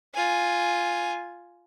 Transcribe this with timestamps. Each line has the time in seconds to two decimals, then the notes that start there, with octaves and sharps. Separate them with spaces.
0.14 F4 G#5